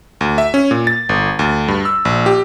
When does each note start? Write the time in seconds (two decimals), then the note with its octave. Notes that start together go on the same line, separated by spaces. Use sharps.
0.21 D2
0.38 E5
0.54 C#4
0.71 A#2
0.87 A6
1.09 G1
1.39 D2
1.68 G2
1.85 E6
2.05 A#1
2.26 G4